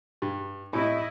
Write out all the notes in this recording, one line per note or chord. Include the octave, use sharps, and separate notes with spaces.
G2
A2 C3 E4 D#5